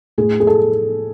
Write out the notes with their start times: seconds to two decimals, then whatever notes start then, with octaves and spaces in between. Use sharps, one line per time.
0.18 A2 G#4
0.40 G#4
0.47 A4